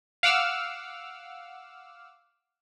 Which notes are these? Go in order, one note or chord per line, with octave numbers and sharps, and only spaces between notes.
F5 F#5 D6 E6 F6